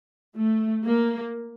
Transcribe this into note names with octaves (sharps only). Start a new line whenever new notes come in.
A3
A#3